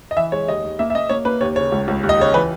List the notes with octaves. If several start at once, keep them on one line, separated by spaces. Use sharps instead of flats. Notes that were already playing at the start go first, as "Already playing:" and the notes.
D#5
E3 E5
G#3 C#5
D#2 D#5
D#2
A#3 E5
E5
A#3 D#5
A#3 C#5
A#3 B4
D#2 C#5
C#3 C#5
C#2
C#2
D#2
D#5
C#3 C#5
E3 B4